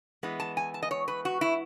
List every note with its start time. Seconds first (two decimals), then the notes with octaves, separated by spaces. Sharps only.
0.23 E3 G#3 B3
0.40 A5
0.57 G#5
0.74 A5
0.83 D#5
0.91 C#5
1.08 B4
1.25 F#4
1.41 E4